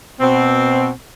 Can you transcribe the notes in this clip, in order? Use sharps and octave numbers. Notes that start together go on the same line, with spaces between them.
B2 C4